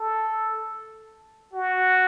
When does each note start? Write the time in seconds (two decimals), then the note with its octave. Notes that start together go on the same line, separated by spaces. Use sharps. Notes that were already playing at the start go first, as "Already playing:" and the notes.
Already playing: A4
1.53 F#4